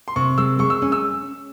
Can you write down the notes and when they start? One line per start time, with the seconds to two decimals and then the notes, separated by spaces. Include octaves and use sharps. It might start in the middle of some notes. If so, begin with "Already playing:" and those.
0.08 C6
0.16 C3 C#6
0.38 G#3 E6
0.59 G#3 C#6
0.70 E6
0.82 C#4
0.92 E6